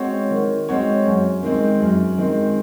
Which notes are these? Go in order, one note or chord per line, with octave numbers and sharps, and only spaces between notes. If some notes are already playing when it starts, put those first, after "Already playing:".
Already playing: G#3 C4 F#4 C#5
D#3
G#3 C4 F#4 C#5
F#2
D#3 G#3 C4
F#2
D#3 G#3 C4